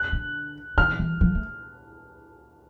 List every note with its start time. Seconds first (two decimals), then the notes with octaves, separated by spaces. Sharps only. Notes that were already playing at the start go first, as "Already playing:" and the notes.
Already playing: F#6
0.12 D3
0.77 D#3 F6
0.99 E3
1.21 F3
1.35 A3